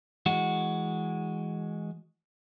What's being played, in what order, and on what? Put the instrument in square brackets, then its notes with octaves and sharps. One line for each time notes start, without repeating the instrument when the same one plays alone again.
[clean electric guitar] E3 G#3 F#4